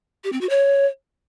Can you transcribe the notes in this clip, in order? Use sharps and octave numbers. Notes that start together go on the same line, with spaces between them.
G4
C4
F#4
C#5